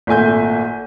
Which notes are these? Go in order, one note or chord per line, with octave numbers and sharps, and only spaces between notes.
G#1 A#2 A3 G#5 G6